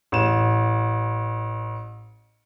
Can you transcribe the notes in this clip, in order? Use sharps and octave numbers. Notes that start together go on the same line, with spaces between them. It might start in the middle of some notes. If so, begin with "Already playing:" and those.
A1 E7